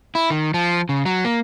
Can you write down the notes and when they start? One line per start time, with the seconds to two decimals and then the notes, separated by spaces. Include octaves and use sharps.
0.15 E4
0.30 D#3
0.54 F3
0.89 C#3
1.06 F#3
1.25 A#3